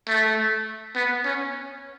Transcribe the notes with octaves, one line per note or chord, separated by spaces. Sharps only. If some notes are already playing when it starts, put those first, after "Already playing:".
A3
B3
C#4